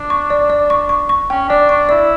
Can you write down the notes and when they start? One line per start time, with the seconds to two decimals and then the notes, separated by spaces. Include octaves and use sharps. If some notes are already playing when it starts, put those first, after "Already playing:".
Already playing: D4
0.10 C#6
0.30 D5
0.50 D5
0.70 C#6
0.89 C#6
1.09 C#6
1.30 C#4 G5
1.49 D4 D5
1.69 D4 C#6
1.89 E4 D5